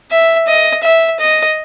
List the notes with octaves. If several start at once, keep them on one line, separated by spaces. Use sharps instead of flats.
E5
D#5
E5
D#5